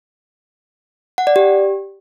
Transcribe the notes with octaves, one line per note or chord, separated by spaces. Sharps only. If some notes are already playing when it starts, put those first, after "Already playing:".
F#5
D5
G4